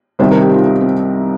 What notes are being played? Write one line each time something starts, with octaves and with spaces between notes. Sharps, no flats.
C2 C3 D#3 G3 C5
A#4
G4
D#4
F4
D#4
C4